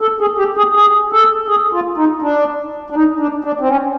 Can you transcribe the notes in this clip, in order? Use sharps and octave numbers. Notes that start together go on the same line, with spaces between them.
A4
G#4
G4
G#4
G#4
A4
G#4
F4
D#4
D4
D4
D#4
D4
D4
C4
C#4